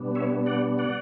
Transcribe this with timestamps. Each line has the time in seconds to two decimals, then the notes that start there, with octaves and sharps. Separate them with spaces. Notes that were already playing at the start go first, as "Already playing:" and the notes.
Already playing: B2 G3 B3 D4
0.15 C#5 E5
0.46 D5 F#5
0.78 D5 F#5